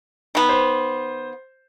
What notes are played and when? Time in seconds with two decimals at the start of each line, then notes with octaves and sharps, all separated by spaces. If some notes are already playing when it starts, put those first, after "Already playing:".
0.35 D#3 B3
0.49 C5